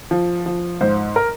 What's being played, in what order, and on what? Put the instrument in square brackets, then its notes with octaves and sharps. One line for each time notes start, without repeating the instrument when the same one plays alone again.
[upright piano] F3
F3
G#2 C5
A#4